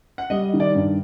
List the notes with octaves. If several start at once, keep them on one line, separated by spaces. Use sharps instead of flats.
F#5
G3 D#5
D#3
D5
G2